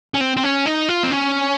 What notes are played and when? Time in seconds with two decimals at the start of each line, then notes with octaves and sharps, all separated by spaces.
0.14 C#4
0.21 C4
0.37 C4
0.43 C#4
0.66 D#4
0.88 F4
1.03 C4
1.11 C#4